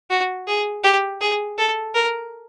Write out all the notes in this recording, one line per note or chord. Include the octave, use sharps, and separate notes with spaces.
F#4
G#4
G4
G#4
A4
A#4